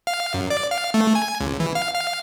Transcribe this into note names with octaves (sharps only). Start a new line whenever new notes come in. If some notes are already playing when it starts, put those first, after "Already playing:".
F5
F#2
D5
F5
A3
G#5
C#2
E3
F5
F5